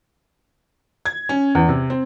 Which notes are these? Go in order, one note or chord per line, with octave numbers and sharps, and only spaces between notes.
G#6
C#4
E2
C3
C4